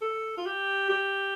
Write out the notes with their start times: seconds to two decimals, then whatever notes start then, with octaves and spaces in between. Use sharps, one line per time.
0.01 A4
0.37 F4
0.46 G4
0.90 G4